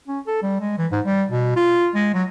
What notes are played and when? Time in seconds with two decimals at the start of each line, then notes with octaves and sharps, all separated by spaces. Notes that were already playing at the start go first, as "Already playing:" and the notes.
0.08 C#4
0.27 A4
0.42 G3
0.60 G#3
0.78 E3
0.92 G#2
1.05 G3
1.29 B2
1.56 F4
1.95 G#3
2.14 F#3